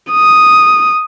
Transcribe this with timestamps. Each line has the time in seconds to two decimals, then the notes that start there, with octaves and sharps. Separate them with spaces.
0.11 D#6